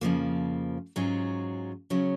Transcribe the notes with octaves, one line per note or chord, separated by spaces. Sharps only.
F2 C#3 F3 A#3
G#2 F#3 C#4 F4 G#4
C#3 F#3 C#4